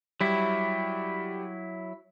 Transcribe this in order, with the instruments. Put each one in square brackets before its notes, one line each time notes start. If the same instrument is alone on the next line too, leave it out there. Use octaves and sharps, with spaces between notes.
[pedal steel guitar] F#3 E4 [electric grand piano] G3